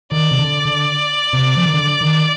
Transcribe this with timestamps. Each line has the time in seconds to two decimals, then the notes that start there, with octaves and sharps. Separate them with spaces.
0.12 D#3 D5
0.31 C3
0.39 D3
0.65 D3
1.33 C3
1.57 F3
1.66 D#3
1.74 D3
2.01 D#3